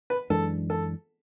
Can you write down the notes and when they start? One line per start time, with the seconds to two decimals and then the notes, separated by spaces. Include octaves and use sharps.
0.10 B4
0.30 F#2 E3 G#3 D4 A4
0.70 A4